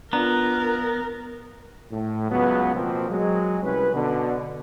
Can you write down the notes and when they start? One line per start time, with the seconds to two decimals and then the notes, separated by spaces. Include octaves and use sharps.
0.13 B3 D4 F4 A#4 A#5
1.91 A2
2.31 C#2 F#3 B3
2.75 B2 F3 A#3 C4
3.10 F#3 G#3
3.63 C2 C#4 B4
3.94 B2 D3